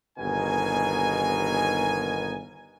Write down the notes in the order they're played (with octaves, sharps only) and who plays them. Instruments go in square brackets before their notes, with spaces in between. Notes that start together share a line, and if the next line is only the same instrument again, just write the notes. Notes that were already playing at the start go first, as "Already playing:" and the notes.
[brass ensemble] G1 D#2 B2 D#4 A#4 G#5